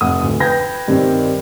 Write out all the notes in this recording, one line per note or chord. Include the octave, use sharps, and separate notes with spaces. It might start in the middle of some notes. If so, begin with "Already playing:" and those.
F1 F#5 D#6
D2
B4 G5 B5 G6 G#6 A#6
G2 D#3 C4